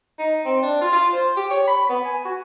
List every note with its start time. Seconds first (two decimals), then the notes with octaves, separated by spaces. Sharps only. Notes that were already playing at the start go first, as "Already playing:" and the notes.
0.19 D#4
0.45 C4
0.62 D4
0.81 F4
0.93 F4
1.13 C5
1.36 G4
1.50 C#5
1.67 B5
1.89 B3
2.05 G#5
2.25 F#4